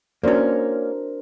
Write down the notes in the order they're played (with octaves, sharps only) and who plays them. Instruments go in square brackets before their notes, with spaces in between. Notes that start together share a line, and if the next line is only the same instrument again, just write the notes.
[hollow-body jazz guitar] A#3 C#4 [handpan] D4 A#4 C5 [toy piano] E4 F#4 D5